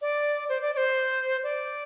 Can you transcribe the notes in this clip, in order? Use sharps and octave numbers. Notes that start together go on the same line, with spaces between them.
D5
C5
D5
D5
C5
D5